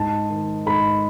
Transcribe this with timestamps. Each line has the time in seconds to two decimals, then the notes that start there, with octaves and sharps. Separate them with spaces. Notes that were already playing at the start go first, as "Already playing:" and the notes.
Already playing: G#2 A5
0.30 D#3
0.67 G#2 B5